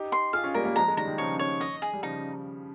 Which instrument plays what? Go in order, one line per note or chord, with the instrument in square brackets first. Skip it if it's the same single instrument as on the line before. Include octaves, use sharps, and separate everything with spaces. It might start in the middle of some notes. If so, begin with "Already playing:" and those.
Already playing: [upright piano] D#4 G4
[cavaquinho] C6
[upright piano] F4 G#4 [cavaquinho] F5
[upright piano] C#4 F4
[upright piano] G3 A#3 [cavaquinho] A#4
[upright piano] G3 A#3
[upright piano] F3 G#3 [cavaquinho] A#5
[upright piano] G#3
[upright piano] D#3 G3 [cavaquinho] A#5
[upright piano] D#3
[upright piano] C#3 F3 [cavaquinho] C#5
[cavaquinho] C#5
D#5
G#4
[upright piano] G3
[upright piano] C#3 F3 [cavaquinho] D#4